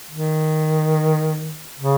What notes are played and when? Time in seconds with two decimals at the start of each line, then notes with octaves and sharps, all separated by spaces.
0.11 D#3
1.79 C#3